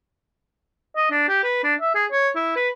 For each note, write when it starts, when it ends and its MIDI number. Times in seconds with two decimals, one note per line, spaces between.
0.96 1.11 75
1.11 1.27 62
1.29 1.39 67
1.43 1.60 71
1.64 1.74 62
1.81 1.94 76
1.95 2.06 68
2.12 2.29 73
2.36 2.55 64
2.56 2.69 71